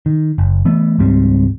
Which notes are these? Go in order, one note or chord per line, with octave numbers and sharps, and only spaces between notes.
D#3
F#1
E3 A3 B3
C#2 G#2 G3 C4